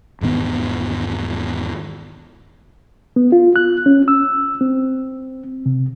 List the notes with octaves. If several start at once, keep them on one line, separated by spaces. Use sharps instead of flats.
E1 G#2 D#3 B3
B3
F4
F#6
C#4
E6
C4
C3